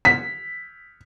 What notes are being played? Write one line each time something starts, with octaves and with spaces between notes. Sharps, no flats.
B6